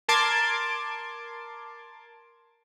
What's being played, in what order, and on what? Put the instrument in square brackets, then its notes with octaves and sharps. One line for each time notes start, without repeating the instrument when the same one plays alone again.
[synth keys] A#4 A5 C6 D6 G#6